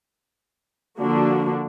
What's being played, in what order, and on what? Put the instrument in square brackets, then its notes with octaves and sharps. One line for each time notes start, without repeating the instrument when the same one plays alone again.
[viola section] D3 F3 A#3 D4 F#4